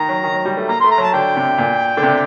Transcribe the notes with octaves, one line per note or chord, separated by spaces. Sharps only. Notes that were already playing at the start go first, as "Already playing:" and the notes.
Already playing: D#3 A#5
F#3
D#3
F#3
G3
A3
A#3 A#5
A3 C6
A#5
F#3
A5
D3 G5
C3
A#2
D3
C3